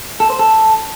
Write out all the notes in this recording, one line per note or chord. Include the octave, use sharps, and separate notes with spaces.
A4
C5
A4